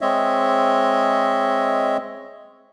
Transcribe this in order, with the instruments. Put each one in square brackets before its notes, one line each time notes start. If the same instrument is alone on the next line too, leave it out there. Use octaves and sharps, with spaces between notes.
[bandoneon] G#3 C4 C#5 D#5 E5